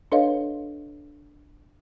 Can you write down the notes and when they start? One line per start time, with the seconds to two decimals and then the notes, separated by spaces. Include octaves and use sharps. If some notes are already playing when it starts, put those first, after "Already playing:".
0.12 D4 A4 B4 C#5 D#5 F5